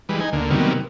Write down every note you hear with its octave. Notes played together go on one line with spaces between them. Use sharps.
E3 G3 G#3 B4
D#4 G#5
D2 D3 A#3
C3 D#3 F#3 G3 A#3 B3